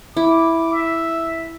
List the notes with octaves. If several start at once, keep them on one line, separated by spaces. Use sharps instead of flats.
E4 D6
E5